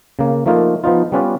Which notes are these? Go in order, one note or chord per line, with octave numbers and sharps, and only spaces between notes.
C#3 A#3
F3 A3 A#3 D#4 F4 A#4
F3 B3 D#4 F4
G3 B3 C#4 F4 B4 D5